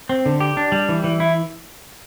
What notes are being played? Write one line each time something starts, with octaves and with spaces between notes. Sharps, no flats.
C4
D3
G4
D4
G3
E3
E3
E4